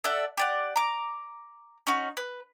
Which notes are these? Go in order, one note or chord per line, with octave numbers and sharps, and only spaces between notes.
A4 D5 E5 F#5
G4 D5 F#5
A#5 D6
C#4 D#4 F#4
B4